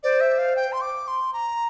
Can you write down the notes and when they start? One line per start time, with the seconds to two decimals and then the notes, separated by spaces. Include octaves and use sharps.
0.03 C5 D5
0.21 E5
0.38 F5
0.56 G5
0.72 C6
0.81 D6
1.08 C6
1.33 A#5